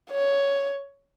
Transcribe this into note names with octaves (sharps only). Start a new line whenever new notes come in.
C#5